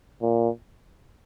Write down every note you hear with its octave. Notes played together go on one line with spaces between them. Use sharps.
A#2